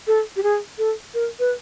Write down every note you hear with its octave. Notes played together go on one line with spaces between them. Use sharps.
A4
G4
G#4
A4
A#4
B4